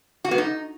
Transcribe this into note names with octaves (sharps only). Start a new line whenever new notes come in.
F#4
B3
D#4